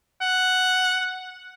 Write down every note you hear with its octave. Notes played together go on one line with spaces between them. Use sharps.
F#5